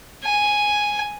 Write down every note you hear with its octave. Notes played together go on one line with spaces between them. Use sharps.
G#5